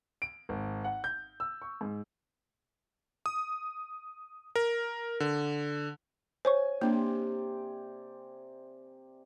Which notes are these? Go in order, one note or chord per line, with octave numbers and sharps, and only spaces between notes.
D7
G#1
F#5
G6
E6
C#6
G#2
D#6
A#4
D3
C5 C#5 G#5 C#6
C3 A#3 D4 D5 C6